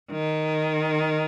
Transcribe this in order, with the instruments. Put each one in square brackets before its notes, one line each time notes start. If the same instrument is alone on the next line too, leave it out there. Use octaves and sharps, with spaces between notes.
[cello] D#3